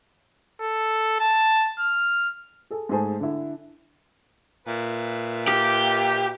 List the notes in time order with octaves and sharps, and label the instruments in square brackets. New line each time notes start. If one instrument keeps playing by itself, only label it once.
[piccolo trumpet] A4
A5
F6
[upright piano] G#4 A4
G#2 A3 G#4 C5 A5
D3 E4
[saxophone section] A#2 B4 E5
[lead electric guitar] G4